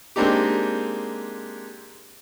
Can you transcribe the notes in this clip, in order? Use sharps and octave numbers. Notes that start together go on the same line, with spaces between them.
G#3 A#3 C4 D4 D#4 G4